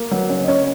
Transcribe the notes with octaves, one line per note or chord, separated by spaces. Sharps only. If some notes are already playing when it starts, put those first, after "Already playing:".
Already playing: A#3
F#3 B4
C#3 C#4 C#5
D#5
C#3 C#4 C#5